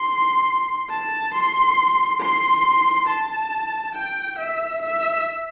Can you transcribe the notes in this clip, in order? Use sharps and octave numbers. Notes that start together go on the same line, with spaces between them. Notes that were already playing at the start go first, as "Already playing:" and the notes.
Already playing: C6
A5
C6
C6
A5
G5
E5
E5